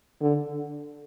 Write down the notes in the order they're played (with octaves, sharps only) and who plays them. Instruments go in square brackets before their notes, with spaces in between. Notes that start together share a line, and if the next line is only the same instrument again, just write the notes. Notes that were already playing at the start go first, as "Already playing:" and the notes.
[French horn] D3